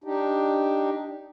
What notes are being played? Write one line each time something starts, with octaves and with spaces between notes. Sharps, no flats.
D4 D#4 G4